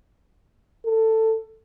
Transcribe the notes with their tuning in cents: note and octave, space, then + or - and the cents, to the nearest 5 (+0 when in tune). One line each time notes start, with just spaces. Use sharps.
A4 +15